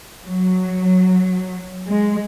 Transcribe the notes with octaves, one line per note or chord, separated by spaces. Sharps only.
F#3
G#3